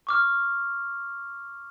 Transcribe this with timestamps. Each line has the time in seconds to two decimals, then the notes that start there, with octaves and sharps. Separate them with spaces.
0.07 C#6 D6 F6